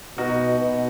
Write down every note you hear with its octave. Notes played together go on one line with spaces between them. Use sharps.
B2 D#4 F#4
B2